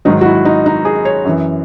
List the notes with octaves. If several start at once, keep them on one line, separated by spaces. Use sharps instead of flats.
G#2 D#3 F#3 D#4
F#4
E4
D#4
D#4
G#4
C#5
F#2 E3